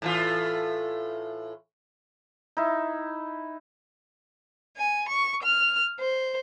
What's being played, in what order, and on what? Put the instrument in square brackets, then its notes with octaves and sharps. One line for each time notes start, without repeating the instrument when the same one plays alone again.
[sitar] A2 E3 F4
[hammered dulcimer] D#4 E4
[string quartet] G#5
C#6
F6
C5